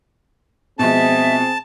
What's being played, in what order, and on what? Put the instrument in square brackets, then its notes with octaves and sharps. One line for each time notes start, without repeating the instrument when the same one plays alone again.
[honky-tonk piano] B2 F3 G#3 [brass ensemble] C4 G#4 [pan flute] E5 [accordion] A5